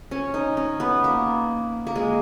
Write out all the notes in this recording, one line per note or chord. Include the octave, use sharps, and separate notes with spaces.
C#4
D#4
C#4
B3
A#3
A#3
G#3